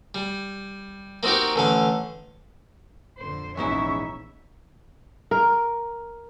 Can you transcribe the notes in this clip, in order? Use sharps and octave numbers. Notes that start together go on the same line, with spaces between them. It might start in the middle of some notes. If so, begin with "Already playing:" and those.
G3
A#3 C4 D#4 F#4 G4
A1 D3 F5
F2 A#2 D3 C5
A#1 E2 G#2 C#4 D#4 E4 E5 C#6
A#4